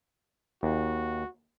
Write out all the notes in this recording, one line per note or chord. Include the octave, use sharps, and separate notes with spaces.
D#2 F#4